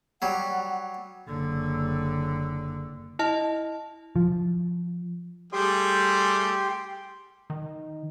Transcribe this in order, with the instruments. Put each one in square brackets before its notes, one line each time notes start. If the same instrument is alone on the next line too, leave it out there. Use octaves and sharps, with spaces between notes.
[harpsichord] F#3 G3 [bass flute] F#5
[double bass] F#1 D3
[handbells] E4 D#5 A5
[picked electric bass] F3
[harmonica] G3 A3 G#4 [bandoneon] G4 G5 C6
[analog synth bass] D#3